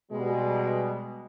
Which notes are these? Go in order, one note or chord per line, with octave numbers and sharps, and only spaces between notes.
B2 G3 G#3